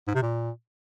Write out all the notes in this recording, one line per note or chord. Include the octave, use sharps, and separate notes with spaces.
G#2
C3
A#2